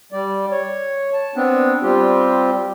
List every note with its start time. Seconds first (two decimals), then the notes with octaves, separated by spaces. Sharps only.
0.12 G3 D5
0.51 C#5
1.13 A5
1.35 B3 C4 D4
1.83 G3 C4 F4 G4